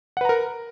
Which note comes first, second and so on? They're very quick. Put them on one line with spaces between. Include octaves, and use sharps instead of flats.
F#5 B4 A#5 A#4